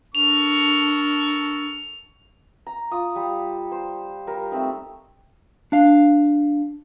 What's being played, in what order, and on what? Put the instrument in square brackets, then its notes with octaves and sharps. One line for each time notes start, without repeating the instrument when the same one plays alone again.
[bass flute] D4 [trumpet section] A4 A#4 C#6 [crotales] F7
[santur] A#5
F4 D6 D#6
G3
C5
G3 A#4
A3 C4 D#4
[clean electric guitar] D4 F5